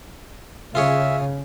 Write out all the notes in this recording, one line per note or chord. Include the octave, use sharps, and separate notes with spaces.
C#3 F4 G#4 C#5 E5